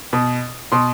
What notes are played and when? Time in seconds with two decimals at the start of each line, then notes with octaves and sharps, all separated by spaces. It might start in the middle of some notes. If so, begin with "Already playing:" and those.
0.13 B2
0.72 B2 C6